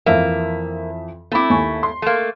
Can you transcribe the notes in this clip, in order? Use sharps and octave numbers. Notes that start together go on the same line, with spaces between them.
F2 E3 A#3 E5
A3 C4 E4 B5 D6
D#2 G#5 C#6
C6
A3 A#3